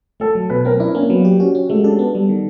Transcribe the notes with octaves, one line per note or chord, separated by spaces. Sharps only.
A3 A4
F#3
B2 B4
C4 A#4
D4 E4
A#3 C#4
F#3 B3
G4
C#4 F#4
C#4
G#3 A3
D4 A4
B3
G3
D#3